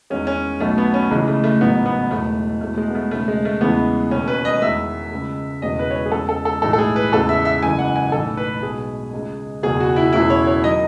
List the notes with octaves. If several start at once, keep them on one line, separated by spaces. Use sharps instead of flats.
E2 D#3 G#3 C#4
C#4
B1 B2 F#3 A3
B3
C#4
C#2 C#3 E3 G#3
A3
A3
A1 G#2 D#3 F#3 B3
B3
E1 E2 D#3 G#3 A3
E1 E2 B2 G#3 A3
G#3
B3
A3
E1 D#2 C#3 G#3 A3
G#3
A3
E2 C#3 E3 G#3 B3
E1 D#2 D#3 C#4
B4
D#5
E2 D#3 G#3 E5
C#2 C#3 G#3
E1 E2 C#3 E3 G#3 D#5
B4
C#5
B4
G#4
E2 C#3 G#3 A4
A4
A4
B1 A2 E3 G#3 A4
A4
G#4
B4
E2 C#3 G#3 A4
E5
E5
F#1 F#2 E3 G#3 G#5
F#5
G#5
B1 A2 E3 A4
B4
B1 B2 G#3 G#4
C#2 C#3 G#3
F#1 E2 B2 G#4
F#4
E4
E1 E2 C#3 E4
C#5
C#5
D#3 F#3 D#5